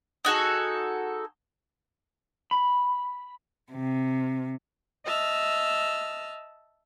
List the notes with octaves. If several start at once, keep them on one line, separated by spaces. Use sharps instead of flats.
D#4 F#4 G#4 A4
B5
C3
D#5 E5 A5 F6